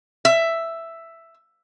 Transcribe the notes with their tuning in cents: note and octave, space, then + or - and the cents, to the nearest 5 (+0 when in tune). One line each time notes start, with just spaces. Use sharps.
E5 +5